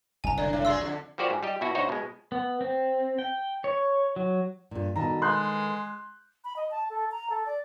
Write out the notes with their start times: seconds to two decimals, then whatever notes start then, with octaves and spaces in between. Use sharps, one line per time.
0.24 F#1 C2 G#5 A#5
0.38 D3 D5
0.53 A2
0.65 F#3 F4 G#4 D5 C6 E6
0.81 F2 D3
1.18 F3 A#3 F#4 G4 C5 D5
1.30 G#2
1.43 G3 G4 D#5
1.61 B2 E4 F#4
1.75 D2 D#4 F#4 C5 C#5 A#5
1.89 B2 G#3
2.32 B3
2.61 C4
3.19 G5
3.64 C#5
4.16 F#3
4.71 G2 A#2
4.96 B2 D#3 A4 B4 A#5
5.22 G#3 C6 F#6 G6
6.44 B5
6.56 D#5
6.71 A5
6.90 A4
7.11 A#5
7.30 A4
7.46 D5